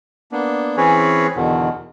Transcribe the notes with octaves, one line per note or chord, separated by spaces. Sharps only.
A#3 B3 D4
E3 C4 C#4 G#4 B4 C#5
E2 B2 D3 D#3